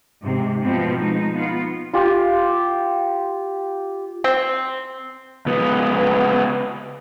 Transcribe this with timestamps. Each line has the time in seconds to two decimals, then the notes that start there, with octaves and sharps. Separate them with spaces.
0.24 G#2 C3
0.63 B2 F3 B3 C4
0.99 G#3 D#4
1.35 B3 F4
1.93 F4 G4
4.24 C4
5.46 C#2 B3